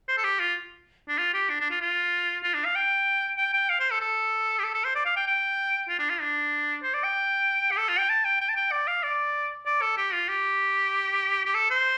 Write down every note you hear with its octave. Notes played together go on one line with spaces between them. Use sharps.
C5
A4
G4
F4
D4
F4
G4
D4
D4
F4
F4
F4
D4
F5
G5
G5
G5
F5
C5
A4
A4
G4
A4
A4
C5
D5
F5
G5
G5
F4
D4
F4
D4
C5
D5
G5
G4
A4
F4
G5
A5
G5
G5
A5
G5
D5
F5
D5
D5
A4
G4
F4
G4
G4
A4
C5